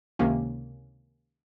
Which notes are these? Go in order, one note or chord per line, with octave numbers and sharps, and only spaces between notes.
C#2 C3 D#3 A#3 C#4